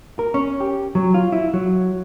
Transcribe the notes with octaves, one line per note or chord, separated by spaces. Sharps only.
A#4
C#4
G4
F#3
F4
E4
F#3